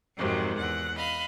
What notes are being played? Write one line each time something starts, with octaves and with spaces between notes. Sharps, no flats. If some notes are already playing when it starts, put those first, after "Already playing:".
F2 G#2 C3 D#3 F#3
E2 F#5
D#5 F5 B5